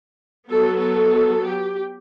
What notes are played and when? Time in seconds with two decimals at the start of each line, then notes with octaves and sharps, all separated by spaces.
0.47 F#3 B3 A4
0.80 A4
1.45 G4